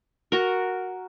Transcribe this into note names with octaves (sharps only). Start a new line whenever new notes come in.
F#4 A#4